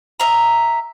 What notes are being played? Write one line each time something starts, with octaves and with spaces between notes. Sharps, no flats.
D#5 E5 A#5